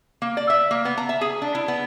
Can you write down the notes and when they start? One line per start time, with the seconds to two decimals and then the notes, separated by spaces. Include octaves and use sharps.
0.22 A#3
0.37 D5
0.50 E5
0.71 A#3
0.85 B3
0.97 A#5
1.09 E5
1.21 G#4
1.42 D4
1.55 E4
1.68 B3